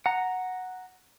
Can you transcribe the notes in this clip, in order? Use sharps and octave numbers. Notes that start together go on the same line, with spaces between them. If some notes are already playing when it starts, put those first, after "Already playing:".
F#5 A#5